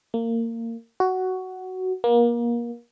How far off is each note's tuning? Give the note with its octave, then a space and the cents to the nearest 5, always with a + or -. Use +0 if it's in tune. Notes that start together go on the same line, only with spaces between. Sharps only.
A#3 -25
F#4 +10
A#3 +30